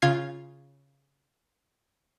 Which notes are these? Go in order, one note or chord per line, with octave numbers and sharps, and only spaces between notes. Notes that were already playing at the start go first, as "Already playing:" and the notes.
C#3 F4 G#6 C7